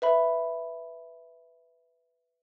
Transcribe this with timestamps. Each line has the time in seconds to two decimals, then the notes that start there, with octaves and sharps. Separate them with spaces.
0.02 B4 E5 B5